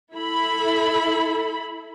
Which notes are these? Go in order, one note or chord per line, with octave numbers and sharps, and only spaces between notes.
E4 A4 B5